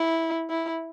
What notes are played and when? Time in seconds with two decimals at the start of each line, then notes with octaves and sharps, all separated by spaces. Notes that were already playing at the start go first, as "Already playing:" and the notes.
Already playing: E4
0.50 E4